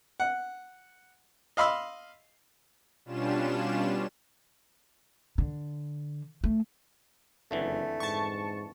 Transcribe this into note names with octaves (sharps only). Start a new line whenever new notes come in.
F#5
D#5 F5 B5 C6 E6
B2 G3 C#4 D4 F4 E7
D3
A3
F#1 F2 D3 E3 A3
G#2 A5 C#6